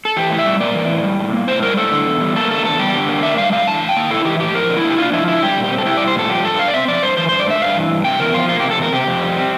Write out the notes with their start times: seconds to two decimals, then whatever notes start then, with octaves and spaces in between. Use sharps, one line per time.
0.05 A4
0.17 E3 G4
0.31 A2
0.39 E5
0.46 G3
0.60 A#3 D5
0.75 E3
0.90 A2
1.04 G3
1.19 A2
1.33 A#3
1.48 A2 C5
1.63 G3 A#4
1.77 A2 A4
1.92 D3
2.06 E2
2.21 G3
2.35 A#3 A4
2.51 D3 A4
2.64 E2 A4
2.79 G3 G4
2.94 D3
3.09 A#3
3.23 D4 E5
3.38 G3 F5
3.52 D3 F5
3.67 E3 A5
3.81 A2
3.89 G5
3.96 A#3
4.11 E4 A4
4.25 E3 G4
4.40 A2 G4
4.54 F3 A#4
4.70 D3
4.77 E4
4.84 A#3
4.90 G4
4.98 D4 F4
5.13 F3 E4
5.27 D3 E4
5.43 G3 G4
5.57 A#2
5.64 G4
5.71 C4
5.78 A4
5.86 E4 G4
5.97 G3 D5
6.08 C5
6.15 A#2 A4
6.30 F3 G4
6.44 G2 A4
6.59 A3 F5
6.68 D5
6.74 C4 E5
6.88 F3 D5
7.02 G2 C5
7.17 E3 C5
7.29 G2 C5
7.39 D5
7.46 A3 E5
7.61 G2 F5
7.76 E3
7.91 G2
8.05 C3 G5
8.20 E2 A#4
8.34 F3 F4
8.49 A#3 F4
8.60 C3 G4
8.71 A4
8.78 E2 A#4
8.92 C3 G4
9.07 F2
9.22 G3
9.37 C4